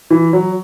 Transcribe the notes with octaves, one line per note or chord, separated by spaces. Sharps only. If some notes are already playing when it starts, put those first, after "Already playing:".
E3
F#3